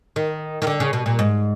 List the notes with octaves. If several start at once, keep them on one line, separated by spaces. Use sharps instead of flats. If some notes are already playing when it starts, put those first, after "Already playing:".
D#3
D#3
D3
C#3
B2
A#2
G#2